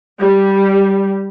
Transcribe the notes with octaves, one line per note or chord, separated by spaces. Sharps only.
G3